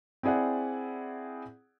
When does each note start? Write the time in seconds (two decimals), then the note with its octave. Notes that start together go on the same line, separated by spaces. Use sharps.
0.23 C4 E4 G#4 D5 F#5